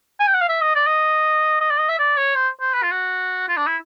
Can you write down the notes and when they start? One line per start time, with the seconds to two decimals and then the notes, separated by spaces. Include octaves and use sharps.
0.20 G#5
0.27 G5
0.34 F#5
0.41 F5
0.49 E5
0.61 D#5
0.75 D5
0.87 D#5
1.61 D#5
1.71 D5
1.79 D#5
1.89 E5
1.99 D5
2.17 C#5
2.35 C5
2.61 C5
2.74 B4
2.83 F4
2.92 F#4
3.48 F4
3.57 D4
3.67 E4